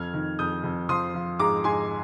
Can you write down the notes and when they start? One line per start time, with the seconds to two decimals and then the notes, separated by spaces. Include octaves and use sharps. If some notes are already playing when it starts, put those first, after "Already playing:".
Already playing: F2 F6 G#6
0.14 D#3
0.39 F2 D#6 G6
0.64 F2
0.89 F3 C6 D#6
1.14 F3
1.39 G#2 A#5 D6
1.64 G#2 G#5 C6